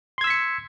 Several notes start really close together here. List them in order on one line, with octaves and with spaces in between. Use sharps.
C6 G#6 E6 B6 C#7